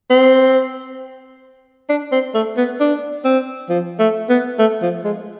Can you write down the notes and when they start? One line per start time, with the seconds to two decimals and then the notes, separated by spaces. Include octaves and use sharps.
0.10 C4
1.89 D4
2.12 C4
2.34 A3
2.57 B3
2.80 D4
3.25 C4
3.69 F3
3.99 A3
4.29 B3
4.59 A3
4.82 F3
5.04 G#3